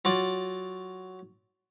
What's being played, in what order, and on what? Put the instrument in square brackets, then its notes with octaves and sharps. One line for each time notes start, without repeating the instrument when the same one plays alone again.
[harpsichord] F#3 F4 D5